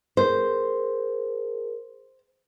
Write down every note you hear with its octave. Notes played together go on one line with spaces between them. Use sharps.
G#4 A#4 C5